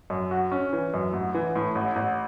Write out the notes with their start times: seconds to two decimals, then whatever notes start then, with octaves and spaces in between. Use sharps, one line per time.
0.10 F#2
0.31 F#4
0.52 C#4
0.73 E3
0.94 F#2
1.13 A1
1.34 E3
1.56 A2
1.75 A1
1.96 A1